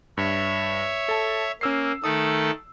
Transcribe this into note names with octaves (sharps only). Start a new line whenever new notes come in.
G2 C#5 E5
A4 A5
A#3 C#4 E6 C7
D#3 A3 A4 D#6